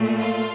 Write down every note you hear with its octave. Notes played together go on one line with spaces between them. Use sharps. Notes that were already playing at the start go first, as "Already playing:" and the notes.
Already playing: A#2 A3
F4